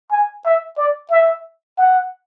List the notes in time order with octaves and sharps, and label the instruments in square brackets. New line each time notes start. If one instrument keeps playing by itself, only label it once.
[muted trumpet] G#5
E5
D5
E5
F#5